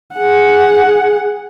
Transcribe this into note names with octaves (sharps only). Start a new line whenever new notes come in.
G#4 F#5